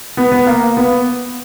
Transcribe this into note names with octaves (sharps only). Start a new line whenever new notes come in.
B3
B3
A#3
B3